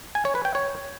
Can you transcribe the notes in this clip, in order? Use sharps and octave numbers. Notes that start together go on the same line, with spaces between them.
G#5
C#5
B4
G5
C#5